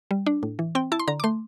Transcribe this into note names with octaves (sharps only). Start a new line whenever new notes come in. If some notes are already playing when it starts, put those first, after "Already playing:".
G3
D4
A2
E3
C4 G5
E4 A5
C6
D3 A#5
D6
A3 C6